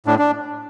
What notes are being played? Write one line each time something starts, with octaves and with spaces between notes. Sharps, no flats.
A2 D4
D4